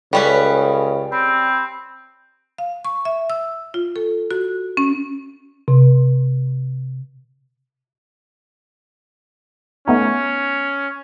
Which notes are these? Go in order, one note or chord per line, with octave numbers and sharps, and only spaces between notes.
C#2 G3 C#4 A4 B4 B5
C4 B5
F5
C#6
E5
E6
F4
A4
F#4
C#4
C3
A3 B3 C#4 D#4